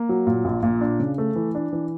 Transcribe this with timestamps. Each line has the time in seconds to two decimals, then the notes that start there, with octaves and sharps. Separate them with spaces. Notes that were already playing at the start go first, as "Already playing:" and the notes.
Already playing: A#3
0.09 F#3
0.27 A#2
0.45 A#1
0.63 A#2
0.81 D4
1.00 C#3
1.18 A3
1.36 E3
1.55 D4
1.73 E3